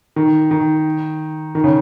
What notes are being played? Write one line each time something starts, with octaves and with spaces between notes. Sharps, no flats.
D#3
D#3
D#3
C#3